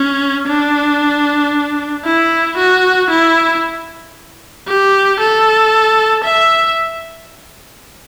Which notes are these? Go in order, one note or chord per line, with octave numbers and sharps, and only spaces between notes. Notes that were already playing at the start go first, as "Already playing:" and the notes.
Already playing: C#4
D4
E4
F#4
E4
G4
A4
E5